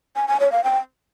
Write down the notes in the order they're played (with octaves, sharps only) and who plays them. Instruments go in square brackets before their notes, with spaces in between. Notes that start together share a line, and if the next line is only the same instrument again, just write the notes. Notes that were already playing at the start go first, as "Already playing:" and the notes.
[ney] G#5
G#5
C#5
F5
G5